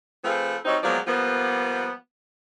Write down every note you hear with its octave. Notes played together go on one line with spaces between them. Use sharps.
F3 A3 C4 F4 G#4 B4
F#3 G3 C4 D#4
F3 F#3 G#3 A#3 B3 D5
F3 G3 A#3 B3